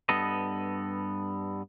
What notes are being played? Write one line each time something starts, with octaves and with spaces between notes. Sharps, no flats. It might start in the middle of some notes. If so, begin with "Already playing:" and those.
G2 B3 A4 D#5